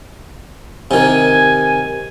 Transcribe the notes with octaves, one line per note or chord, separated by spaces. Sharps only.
C3 D#3 G#5